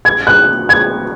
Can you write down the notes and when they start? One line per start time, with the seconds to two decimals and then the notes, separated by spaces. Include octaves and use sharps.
0.05 G#6
0.27 F#6
0.69 G#6